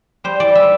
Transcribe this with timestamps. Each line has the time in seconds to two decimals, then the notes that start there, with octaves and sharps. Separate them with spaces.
0.24 G3 C5
0.40 E3 D5
0.55 G3 E5